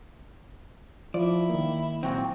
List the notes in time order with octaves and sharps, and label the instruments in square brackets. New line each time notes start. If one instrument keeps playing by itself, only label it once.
[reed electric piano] F3 [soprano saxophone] E4 [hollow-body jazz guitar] D5
[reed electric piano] D#3 A#3
[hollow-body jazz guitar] A#2 F#3 C4